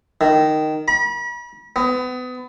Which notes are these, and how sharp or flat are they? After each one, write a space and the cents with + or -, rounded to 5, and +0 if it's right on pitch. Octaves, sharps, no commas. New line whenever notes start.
D#3 -5
B5 -40
B3 +30